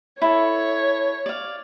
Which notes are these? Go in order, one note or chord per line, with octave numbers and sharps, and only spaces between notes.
E4 A4 C#5
D5 F5